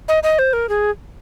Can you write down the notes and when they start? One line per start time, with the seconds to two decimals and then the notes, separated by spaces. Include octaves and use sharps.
0.08 D#5
0.23 D#5
0.39 C5
0.53 A#4
0.69 G#4